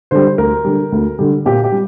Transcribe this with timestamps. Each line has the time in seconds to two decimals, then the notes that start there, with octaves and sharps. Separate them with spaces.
0.11 D3 G3 C5
0.38 D2 A#4
0.65 D3 G3
0.92 D2
1.19 D3 G3
1.46 A#2 G4
1.64 G4
1.72 G3